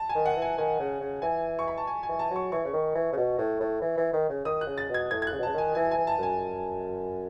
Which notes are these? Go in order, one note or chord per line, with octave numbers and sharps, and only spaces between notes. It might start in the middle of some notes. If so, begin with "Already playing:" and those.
Already playing: A5
G#5
D#3
F#5
E3
G#5
D#3 G#5
C#3
C#3
E3 G#5
C#6
B5
A5
G#5
G#5
E3
A5
F#3 C#6
E3 C#6
C#3
D#3
E3
C#3
B2
A2
A2
E3
E3
D#3
C#3
D#3 D#6
F#6
C#3
A6
B2
G#6
A2 G#6
G#6
C#3 F#6
B2
C#3 A5
D#3 G#5
E3 G#5
G#5
E3
A5
F#2 G#5